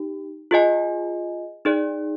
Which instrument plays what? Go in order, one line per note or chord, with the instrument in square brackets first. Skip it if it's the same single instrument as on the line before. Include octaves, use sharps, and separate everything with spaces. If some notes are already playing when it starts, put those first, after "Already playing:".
Already playing: [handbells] D#4 G4
F4 G#4 D#5 G#5
D#4 G#4 D5